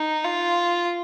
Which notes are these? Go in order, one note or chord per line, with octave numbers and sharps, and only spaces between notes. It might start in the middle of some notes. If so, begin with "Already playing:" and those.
Already playing: D#4
F4